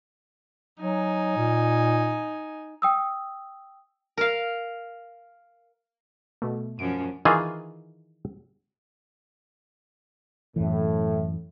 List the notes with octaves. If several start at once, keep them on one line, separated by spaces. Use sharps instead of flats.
F#3 D#4 G#5
A#2
G5 D#6 E6
A#4 F5
B2 A3
F#2 F3 C#4 D7
D#3 E3 F4 G#4
F#2 A2 E3